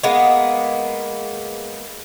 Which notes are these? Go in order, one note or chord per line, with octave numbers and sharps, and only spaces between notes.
G#3 A#3 B3